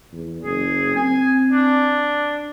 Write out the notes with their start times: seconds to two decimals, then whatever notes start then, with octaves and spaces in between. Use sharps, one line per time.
0.13 E2
0.43 F#1 G#4
0.96 C4 G#5
1.51 D4